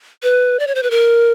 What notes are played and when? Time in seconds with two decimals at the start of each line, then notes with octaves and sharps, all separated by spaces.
0.23 B4
0.59 D5
0.67 C#5
0.75 C5
0.83 B4
0.91 A#4